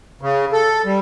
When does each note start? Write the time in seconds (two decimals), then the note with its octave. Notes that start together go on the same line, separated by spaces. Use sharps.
0.21 C#3
0.53 A4
0.85 G3